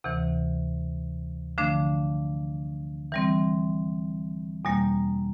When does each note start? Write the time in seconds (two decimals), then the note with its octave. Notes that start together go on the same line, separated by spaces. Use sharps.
0.04 D2 C3 E3
1.58 D3 F3 A3 D4
3.12 E3 G3 C4
4.65 E2 B2 G3 A#3